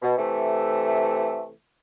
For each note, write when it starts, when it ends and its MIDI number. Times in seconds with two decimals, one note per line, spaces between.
0.02 0.14 47
0.18 1.49 48
0.18 1.49 52
0.18 1.49 57